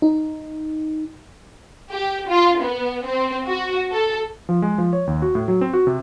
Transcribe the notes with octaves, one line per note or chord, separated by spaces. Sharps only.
D#4
G4
F4
B3
C4
F#4
A4
F3
G#3
F3
C#5
D#2
F#4
A2
F#3
C4
F#4
C3